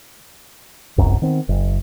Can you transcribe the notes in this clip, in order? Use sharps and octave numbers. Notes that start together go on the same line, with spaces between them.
D1 G1 C2 F#2
D#3 B3 C4
F#1